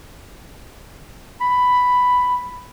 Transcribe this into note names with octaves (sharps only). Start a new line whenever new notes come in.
B5